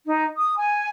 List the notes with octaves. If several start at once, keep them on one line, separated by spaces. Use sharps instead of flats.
D#4
D#6
G#5